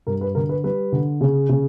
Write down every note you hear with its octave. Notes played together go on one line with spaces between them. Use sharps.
G2 A#4
B4
D3 A#4
B4
G3 B4
D3
C#3
C#3